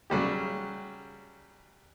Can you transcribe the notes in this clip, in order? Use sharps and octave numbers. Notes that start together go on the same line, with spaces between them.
C#3 F#3 G3 G4